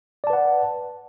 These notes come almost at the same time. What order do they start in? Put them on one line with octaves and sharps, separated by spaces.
D5 A5 B4 F#5